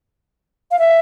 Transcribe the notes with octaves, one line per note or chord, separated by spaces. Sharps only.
F5
E5